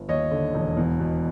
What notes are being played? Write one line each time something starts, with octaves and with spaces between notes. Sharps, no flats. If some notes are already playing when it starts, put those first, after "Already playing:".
Already playing: G1
D#2 C#5 D#5
D3
E1
E2
B2